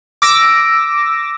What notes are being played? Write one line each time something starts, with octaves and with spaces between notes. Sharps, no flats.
D6 E6 A#6